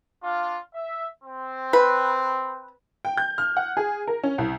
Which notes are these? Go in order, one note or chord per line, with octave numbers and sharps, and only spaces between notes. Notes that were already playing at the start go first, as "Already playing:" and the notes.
D4 F4
E5
C4
B4
G5
G6
F6
F#5
G#4
A#4
C#4
C2